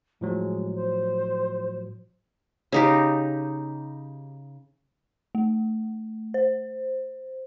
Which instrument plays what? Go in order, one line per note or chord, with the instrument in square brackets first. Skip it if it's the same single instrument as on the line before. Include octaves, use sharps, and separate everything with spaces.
[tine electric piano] A2 F3 F#3 [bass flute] G#3
[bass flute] C5
[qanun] C#3 D#4 G4
[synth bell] A3
C5